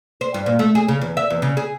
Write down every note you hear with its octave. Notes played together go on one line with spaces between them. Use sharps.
C5
G2
A#2
A3
G#4
C#3
E2
E5
E2
C#3
G#4